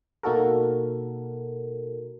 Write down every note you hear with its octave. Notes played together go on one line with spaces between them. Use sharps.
B2 A#3 D#4 F#4 A4 A#4